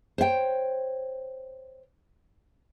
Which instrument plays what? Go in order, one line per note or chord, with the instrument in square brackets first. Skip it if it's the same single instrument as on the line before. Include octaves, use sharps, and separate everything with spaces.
[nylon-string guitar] C5 C#5 F5 G5